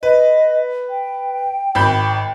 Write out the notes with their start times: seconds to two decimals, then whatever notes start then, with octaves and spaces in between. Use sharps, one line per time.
0.03 B4 D#5
0.89 G5
1.75 G#1 B5 G6